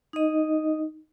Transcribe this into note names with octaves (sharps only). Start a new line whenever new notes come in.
D#4 D#5